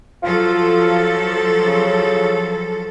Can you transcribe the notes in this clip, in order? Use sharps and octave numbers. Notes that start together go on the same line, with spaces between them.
F3 F#3 F4 A4
C#3